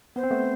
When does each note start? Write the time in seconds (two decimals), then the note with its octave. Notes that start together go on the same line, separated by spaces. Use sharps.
0.16 B3 C5
0.23 C4
0.30 A3 B3